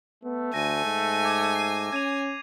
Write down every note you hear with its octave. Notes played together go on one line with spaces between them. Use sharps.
A3 B3
D2 G#5 A#6 D#7
G#2
D6 G#6
C7 D#7
C#4 G#6 D#7 F7